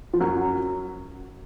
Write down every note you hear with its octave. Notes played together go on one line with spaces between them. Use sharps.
F3
F#2 F#3